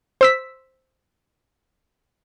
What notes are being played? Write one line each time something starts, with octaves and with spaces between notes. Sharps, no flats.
C5 E6 B6